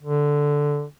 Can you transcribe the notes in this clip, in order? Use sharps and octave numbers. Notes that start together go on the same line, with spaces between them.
D3